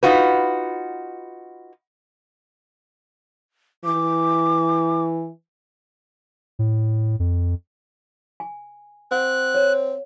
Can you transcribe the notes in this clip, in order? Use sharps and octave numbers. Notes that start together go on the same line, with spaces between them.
D#4 F4 F#4 B4
E3 D6
A2
F2
G#5
C4 F#5 F#6
C#5